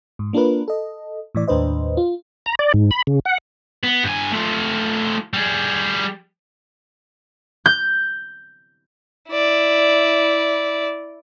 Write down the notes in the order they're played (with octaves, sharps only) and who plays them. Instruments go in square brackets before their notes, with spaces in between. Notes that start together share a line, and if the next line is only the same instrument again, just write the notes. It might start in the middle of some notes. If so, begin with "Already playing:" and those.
[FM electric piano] G#2
A#3 D4 F4 A#4 B4
A4 D#5
A2 E3 D5
D#2 A2 D4 B4 C5 D#5
F4
[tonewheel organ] A#5
D5
G#2
B5
C#3
F#5
[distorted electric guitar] B3
G2 G#5
A3 F4
G3 G#4
[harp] G6
[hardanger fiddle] E4 D5